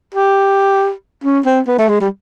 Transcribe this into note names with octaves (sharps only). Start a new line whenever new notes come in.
G4
C#4
C4
B3
A3
G#3
G3